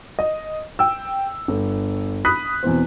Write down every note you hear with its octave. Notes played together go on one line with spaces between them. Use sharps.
D#5
G5 E6
G1
B5 D#6 F#6 B6
E2 B2 B3 C4